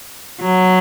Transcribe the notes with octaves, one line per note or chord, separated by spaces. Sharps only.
F#3